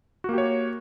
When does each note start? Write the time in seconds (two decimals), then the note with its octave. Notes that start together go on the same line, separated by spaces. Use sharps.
0.24 F#4
0.29 A#3
0.33 G4
0.38 C#5